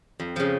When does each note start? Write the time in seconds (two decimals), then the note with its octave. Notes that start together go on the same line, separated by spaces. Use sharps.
0.20 F2
0.36 C#3 F3